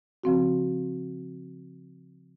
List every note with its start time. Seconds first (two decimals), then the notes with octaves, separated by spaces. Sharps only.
0.24 C#3 F3 C4 F#4